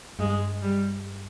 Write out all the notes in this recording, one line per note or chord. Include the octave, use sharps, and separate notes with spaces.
G2 G#3
G3